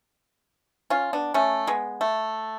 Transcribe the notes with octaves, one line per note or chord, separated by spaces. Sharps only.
C#4 F4
B3 D4
A3 C#4
G#3 B3
A3